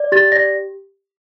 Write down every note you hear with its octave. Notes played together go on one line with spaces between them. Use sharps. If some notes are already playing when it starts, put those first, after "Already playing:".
Already playing: D5
G4 A6
D5 A#6